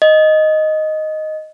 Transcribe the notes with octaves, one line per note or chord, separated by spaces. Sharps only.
D#5